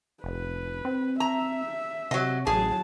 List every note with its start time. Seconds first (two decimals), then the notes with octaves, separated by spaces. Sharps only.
0.24 F1 B4
0.85 C4
1.20 E5 A#5
2.11 C3 F#3 D#5
2.47 A1 F#3 G#4 A5